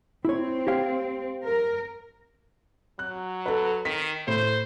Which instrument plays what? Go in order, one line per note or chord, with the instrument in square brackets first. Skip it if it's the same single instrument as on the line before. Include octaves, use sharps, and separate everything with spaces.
[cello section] C4 [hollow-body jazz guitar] E4 C#5
[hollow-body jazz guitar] G4 C#5 F5
[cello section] A#4
[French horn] F#3 [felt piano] F#6
[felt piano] A4 B4
[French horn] D#3 [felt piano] B6
[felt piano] A2 [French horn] C5